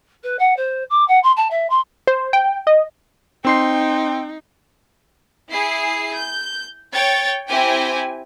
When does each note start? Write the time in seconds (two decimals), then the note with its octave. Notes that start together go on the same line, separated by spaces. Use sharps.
0.23 B4
0.39 F#5
0.56 C5
0.90 D6
1.07 F#5
1.23 C6
1.36 A5
1.50 E5
1.69 C6
2.07 C5
2.33 G5
2.67 D#5
3.45 C4 D#4 G5 C6 C7
5.52 E4 G#4 C7
6.17 G6
6.93 C#5 G5 A6
7.48 C4 E4 G4 G5 G#5